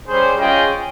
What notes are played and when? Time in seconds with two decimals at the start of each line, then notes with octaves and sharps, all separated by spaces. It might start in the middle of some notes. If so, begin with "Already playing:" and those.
0.08 G3 C#4 G#4 C5
0.39 C#4 F4 G#4 D#5 G5